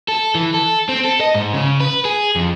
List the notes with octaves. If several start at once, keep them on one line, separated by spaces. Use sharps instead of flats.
A4
E3
A4
C4
A4
D#5
G#2
C#3
B4
G#4
F2